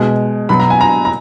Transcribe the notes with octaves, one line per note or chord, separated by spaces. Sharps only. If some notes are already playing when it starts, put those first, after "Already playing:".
Already playing: B2 G#3
B2 F#3 B5
A#5
G#5
A#5
A#5